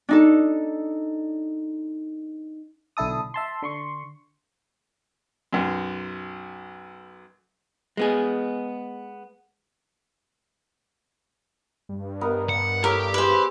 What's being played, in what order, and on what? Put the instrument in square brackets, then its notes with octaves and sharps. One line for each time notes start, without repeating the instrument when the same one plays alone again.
[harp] D4 D#4 A4
[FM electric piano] B1 D3 E4 A4 D#6
E5 A5 C6
D3 C6 C#6
[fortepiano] B1 F#2
[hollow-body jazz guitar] G#3 B3 G#4
[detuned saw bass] G2
[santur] B3 A#4 D#5
[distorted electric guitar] F#5
[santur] E4 A4 C#5 [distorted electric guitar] G4 [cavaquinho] A#4
[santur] E4 G#4 [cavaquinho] B4 C5